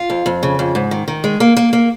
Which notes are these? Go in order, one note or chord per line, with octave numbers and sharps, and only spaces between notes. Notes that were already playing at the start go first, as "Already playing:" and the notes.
Already playing: F4
F2
F2
C#3
F2
G#2
D#3
D#3
G#3
A#3
A#3
A#3